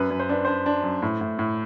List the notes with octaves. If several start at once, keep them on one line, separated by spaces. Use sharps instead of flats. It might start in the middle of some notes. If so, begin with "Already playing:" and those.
Already playing: F#2 B4
F#2
C5
D4 B4
D4 C5
D4
F#2
A2
A2
A2